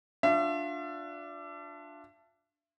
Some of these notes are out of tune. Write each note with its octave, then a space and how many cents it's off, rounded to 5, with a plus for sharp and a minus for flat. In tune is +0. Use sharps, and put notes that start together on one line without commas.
D4 +0 F4 +35 E5 +35